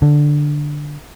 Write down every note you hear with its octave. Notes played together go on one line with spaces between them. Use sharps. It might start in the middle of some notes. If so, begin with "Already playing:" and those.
D3